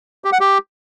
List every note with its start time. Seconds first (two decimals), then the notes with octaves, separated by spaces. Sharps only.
0.24 G4
0.32 F#5
0.40 G4